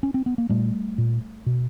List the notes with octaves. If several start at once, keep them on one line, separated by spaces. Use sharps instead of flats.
C#4
C4
B3
A#3
A#2 G3 A3
A#2
B2